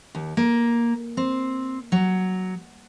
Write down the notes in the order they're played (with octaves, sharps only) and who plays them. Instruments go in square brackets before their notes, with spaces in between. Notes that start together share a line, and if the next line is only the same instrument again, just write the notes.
[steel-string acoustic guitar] D#2
A#3
C4
F#3